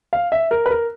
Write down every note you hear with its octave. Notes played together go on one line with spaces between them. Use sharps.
F5
E5
A#4
B4
A#4